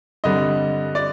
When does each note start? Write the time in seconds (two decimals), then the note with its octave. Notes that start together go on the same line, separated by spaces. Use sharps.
0.24 G2 D3 G3 C4 D#5
0.95 D5